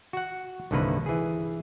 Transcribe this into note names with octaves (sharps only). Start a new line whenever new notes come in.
F#4 F#5
C2 G2 D3 D#3 A#3 B4
E3 G#4